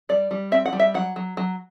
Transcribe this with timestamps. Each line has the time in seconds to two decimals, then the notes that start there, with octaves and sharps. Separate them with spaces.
0.09 G3 D5
0.31 G3
0.52 C4 E5
0.66 F#5
0.73 G3
0.80 E5
0.94 F#3 F#5
1.16 F#3
1.37 F#3